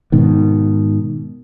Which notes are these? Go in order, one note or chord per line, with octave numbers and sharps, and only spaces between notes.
G#2 B2 D#3